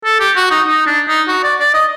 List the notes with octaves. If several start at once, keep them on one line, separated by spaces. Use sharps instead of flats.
A4
G4
F#4
D#4
D#4
D4
D#4
F#4
D5
D5
D#5